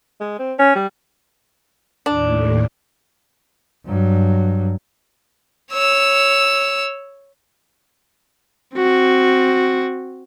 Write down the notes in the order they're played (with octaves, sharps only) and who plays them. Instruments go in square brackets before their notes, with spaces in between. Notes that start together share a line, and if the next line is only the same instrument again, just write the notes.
[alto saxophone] G#3
C4
C#4
G3
[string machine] D#2 A2 [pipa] D4
[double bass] G2 F#3
[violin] C#5 E6
[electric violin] C4 F#4